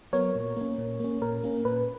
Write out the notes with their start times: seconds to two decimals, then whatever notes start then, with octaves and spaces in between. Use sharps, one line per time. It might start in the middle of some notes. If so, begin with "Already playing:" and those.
0.13 F#3 B3 A#4 C#5
0.36 A#2
0.57 A#3 C#4
0.78 A#2
1.00 A#3 C#4
1.22 A#2 A#4
1.44 A#3 C#4
1.65 A#2 B4